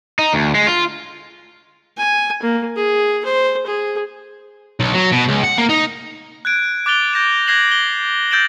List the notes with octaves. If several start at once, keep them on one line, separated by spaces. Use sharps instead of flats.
D#4
D2
G#3
F4
G#5
A#3
G#4
C5
G#4
B1
F#3
B2
C#2
F#5
A#3
D#4
F#6 G#6 D7
D6 F#6 A6 F7 G7
G6 A#6 D7 E7
F#6 G#6 A#6 C7 E7 F#7
G7
E6 G6 A6 D7 E7 F#7